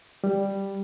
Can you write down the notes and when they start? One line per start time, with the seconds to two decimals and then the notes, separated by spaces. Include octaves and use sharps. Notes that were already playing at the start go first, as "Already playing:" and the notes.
0.24 G3